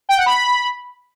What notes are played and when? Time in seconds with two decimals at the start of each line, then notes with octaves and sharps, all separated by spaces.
0.09 G5
0.17 F#5
0.26 B5